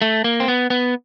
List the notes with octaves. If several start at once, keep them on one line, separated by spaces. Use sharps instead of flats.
A3
A#3
C4
B3
B3